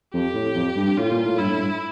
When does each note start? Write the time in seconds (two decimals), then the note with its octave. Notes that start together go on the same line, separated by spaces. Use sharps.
0.14 F2 G4
0.34 A2
0.55 F2
0.76 G2
0.97 A2 F4
1.11 A#2
1.25 A2
1.38 G2 E4
1.49 A2
1.60 G2